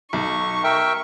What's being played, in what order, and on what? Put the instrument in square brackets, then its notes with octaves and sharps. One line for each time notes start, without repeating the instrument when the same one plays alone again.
[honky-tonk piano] B1 [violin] C#6
[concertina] A#4 E5 G5